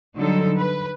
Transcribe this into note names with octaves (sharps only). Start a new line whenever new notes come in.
D3 F#3 G3 D#4 A4
B4